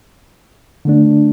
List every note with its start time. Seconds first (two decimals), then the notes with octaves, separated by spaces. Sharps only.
0.85 D3 A3 D4